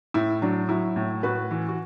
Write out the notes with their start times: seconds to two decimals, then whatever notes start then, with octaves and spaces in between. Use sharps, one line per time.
0.14 A2 E4
0.42 F#3 D4
0.69 F#3 E4
0.96 A2
1.23 A2 F#4 B4
1.51 E3
1.69 F#4